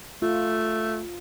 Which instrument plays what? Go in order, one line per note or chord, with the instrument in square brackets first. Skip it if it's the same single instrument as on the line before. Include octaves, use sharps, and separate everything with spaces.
[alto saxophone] A3 [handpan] F4